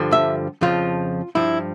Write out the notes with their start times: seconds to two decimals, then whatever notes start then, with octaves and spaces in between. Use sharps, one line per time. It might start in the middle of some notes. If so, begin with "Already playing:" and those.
Already playing: G2 D3 F3
0.12 E5
0.61 F2 C#3 F3 F4
1.35 G2 F3 E4